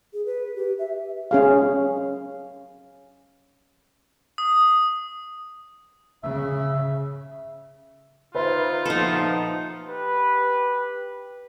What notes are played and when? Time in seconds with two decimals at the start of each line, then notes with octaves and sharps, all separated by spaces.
0.13 G#4
0.26 B4
0.56 G4
0.79 E5
1.31 C#4 G#4 F5
4.38 D#6
6.23 C#3 E5
8.35 D#4 F4 B4 C5 E5
8.85 A#2 F3 B3 D#4 A4
9.88 G4 B4